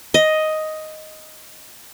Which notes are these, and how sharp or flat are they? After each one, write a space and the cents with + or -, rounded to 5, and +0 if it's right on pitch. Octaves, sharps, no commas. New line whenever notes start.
D#5 +5